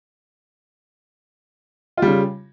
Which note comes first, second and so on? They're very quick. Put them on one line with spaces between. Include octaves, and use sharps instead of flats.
F4 G3 C#3